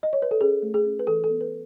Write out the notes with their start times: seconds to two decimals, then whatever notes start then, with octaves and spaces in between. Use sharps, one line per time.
0.03 D#5
0.13 C#5
0.22 B4
0.31 A4
0.41 C#4 G#4
0.62 A3
0.74 G#4
0.86 C#4
0.99 B4
1.07 E3 A4
1.24 A4
1.30 B3
1.41 B4